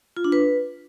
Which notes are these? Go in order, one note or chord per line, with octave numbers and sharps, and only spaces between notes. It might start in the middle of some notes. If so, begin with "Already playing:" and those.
F4
D4
B4